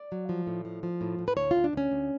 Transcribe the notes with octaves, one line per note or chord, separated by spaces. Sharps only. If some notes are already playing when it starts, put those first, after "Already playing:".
Already playing: D5
F#3
F3
A2
F3
F3
A2
A2
B4
D2 C#5
D2 F4
D4
D2 C#4
D2